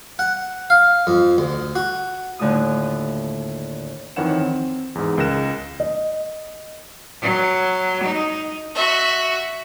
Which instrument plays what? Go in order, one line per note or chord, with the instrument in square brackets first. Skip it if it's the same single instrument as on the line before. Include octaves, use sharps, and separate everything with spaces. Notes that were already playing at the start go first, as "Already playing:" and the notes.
[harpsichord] F#5
F5
F2
D2
F#4
[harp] D#2 A2 D3 A3 F4 D#6
[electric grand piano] F2 D#3 E3 C#5 F#5 E7
C4
E2 G#2
C#2 A#4 F#6 A#6 E7
[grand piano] D#5
[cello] F#3
D#4
[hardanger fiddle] F#4 E5